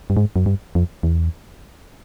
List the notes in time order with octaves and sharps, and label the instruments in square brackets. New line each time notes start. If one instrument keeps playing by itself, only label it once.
[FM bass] G2
G#2
F#2
G2
F2
E2